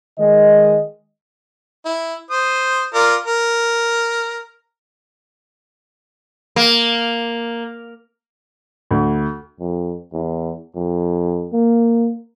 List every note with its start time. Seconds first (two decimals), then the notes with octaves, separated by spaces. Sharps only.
0.18 D#3 G#3 D#5
1.85 E4
2.30 C5 D#6
2.94 F4 A#4 D5
3.26 A#4
6.56 A#3
8.91 D2
9.60 F2
10.12 E2
10.75 F2
11.53 A#3